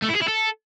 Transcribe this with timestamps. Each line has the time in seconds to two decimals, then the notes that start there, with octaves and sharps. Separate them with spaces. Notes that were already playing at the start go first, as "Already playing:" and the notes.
0.02 A3
0.09 E4
0.15 G#4
0.21 E4
0.28 A4